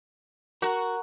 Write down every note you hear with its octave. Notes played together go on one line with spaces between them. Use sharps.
F#4 A#4